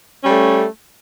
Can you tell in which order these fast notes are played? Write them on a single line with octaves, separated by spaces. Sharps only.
C#4 G3 A3